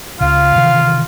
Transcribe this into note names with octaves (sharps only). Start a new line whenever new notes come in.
C#2 C#3 F4 F5
C3 D#3 E3